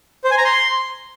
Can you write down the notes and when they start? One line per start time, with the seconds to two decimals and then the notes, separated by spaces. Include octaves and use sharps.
0.24 C5
0.31 G#5
0.38 A#5
0.44 C6